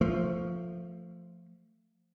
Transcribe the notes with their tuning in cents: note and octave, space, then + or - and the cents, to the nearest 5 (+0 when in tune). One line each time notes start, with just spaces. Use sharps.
F3 +0 A3 +20